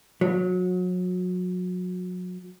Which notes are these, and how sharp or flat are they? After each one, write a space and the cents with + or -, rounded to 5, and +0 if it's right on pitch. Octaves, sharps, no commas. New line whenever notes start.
F#3 -30